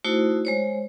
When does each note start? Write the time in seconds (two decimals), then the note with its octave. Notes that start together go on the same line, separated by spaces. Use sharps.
0.04 A3 D#4 E4 F#4 C5
0.45 G#3 C5 C#5